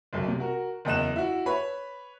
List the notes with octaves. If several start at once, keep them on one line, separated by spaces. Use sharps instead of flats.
F#1 B1
C3
F#4 A#4
F#1 E2 D#5 F#6 E7
E4 F#4
B4 C#5 B5